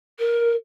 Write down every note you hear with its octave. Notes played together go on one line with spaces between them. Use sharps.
A#4